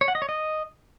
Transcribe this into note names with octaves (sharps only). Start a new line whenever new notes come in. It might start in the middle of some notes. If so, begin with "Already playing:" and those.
C#5
F#5
D#5
C#5
D#5